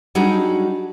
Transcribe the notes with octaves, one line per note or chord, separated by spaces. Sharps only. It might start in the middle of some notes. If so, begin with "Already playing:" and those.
F#3 G3 D4 D#4 F#4 G#4